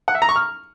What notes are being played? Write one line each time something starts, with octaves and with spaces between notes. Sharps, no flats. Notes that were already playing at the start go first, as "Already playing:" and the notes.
F#5
E5
A#5
C#6
F6